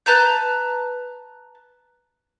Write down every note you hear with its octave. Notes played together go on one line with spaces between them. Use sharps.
B4 A5 A#5 G6